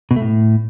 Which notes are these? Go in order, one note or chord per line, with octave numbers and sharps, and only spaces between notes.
B2
A3
A2